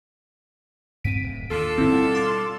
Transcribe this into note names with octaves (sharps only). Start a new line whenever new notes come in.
G2 C4 B6 D7 D#7
D1
D#2 D4 F4 A4
G1 A2 D#3 C4 E4
B2 G3
C6 D6 A6